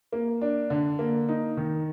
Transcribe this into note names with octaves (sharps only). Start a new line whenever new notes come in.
A#3
D4
D3
A#3
D#4
D#3